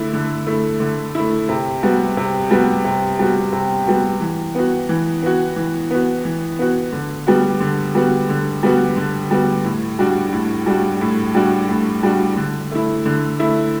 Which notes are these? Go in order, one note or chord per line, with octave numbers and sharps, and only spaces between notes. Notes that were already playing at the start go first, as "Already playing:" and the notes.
Already playing: D3 A3 E4
D3
A3 E4
D3
A3 E4
C3
G3 B3 F#4
C3
G3 B3 F#4
C3
G3 B3 F#4
C3
G3 B3 F#4
E3
B3 F#4
E3
B3 F#4
E3
B3 F#4
E3
B3 F#4
D3
G3 B3 F#4
D3
G3 B3 F#4
D3
G3 B3 F#4
D3
G3 B3 F#4
A2
G3 D4 F#4
A2
G3 D4 F#4
A2
G3 D4 F#4
A2
G3 D4 F#4
D3
A3 E4
D3
A3 E4